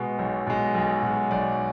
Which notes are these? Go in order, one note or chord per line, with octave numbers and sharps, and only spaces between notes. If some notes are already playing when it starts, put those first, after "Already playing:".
Already playing: B2 G#3 B4
B1
B2 G#3
B1
B2 G#3
B1 D5